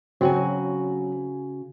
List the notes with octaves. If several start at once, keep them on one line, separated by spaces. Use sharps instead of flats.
C#3 F#3 C4 F#4 G#5